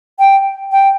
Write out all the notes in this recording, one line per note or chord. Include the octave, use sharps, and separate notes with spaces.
G5
G5